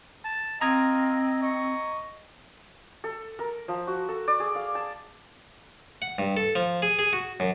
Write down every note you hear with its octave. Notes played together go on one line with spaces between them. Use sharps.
A5
C4 F4 D#5 A#5 D#6 G#6
D#5 C#6
A4
A#4
F3
F#4
A4
D5
G#4
F5
A5
F#5
G2
A4
F3
G#4
G#4
F#4
F#2